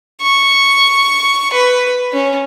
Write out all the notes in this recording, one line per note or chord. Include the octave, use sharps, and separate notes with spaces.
C#6
B4
C#4